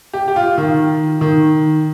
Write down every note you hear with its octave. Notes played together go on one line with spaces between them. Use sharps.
G4
G4
F4
D#3
D#3